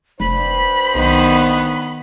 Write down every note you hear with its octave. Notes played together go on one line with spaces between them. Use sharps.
F1 G2 D4 C5 B5
B1 D#3 B3 D#4